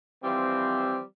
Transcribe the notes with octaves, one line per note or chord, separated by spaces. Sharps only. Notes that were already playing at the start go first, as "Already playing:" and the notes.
E3 F3 G3 C4